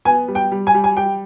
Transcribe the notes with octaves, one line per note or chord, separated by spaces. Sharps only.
B3 G#5
G3
G5
G3
G#5
G3
G#5
G3 G5